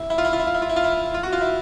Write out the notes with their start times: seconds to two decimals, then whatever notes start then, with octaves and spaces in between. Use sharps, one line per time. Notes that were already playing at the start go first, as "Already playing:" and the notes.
Already playing: E4
0.10 E4
0.18 F4
0.25 E4
0.33 F4
0.40 E4
0.47 F4
0.54 E4
0.62 F4
0.69 E4
0.76 F4
0.84 E4
1.14 F4
1.23 F#4
1.32 F4
1.41 E4